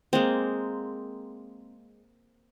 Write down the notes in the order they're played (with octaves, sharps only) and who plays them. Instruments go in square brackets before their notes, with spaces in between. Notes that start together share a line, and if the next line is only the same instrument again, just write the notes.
[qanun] G#3 A#3 C4